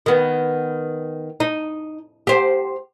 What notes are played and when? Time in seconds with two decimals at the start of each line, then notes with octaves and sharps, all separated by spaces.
0.06 D#3 B3
1.40 D#4
2.27 G4 C5